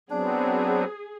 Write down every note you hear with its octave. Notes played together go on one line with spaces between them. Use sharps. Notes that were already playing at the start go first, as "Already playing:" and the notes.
F#3 B3 C4 D4 G#4